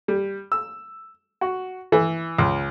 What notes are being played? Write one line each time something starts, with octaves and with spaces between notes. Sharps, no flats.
G3
E6
F#4
E3
C#2